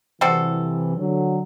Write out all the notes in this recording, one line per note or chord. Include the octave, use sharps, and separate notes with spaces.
C3 E3 G3 C4 F#4 A4
D3 F#3